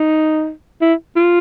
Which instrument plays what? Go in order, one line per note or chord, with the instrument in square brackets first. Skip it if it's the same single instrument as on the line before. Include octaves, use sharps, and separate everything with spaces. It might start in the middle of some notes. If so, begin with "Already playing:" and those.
Already playing: [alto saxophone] D#4
E4
F4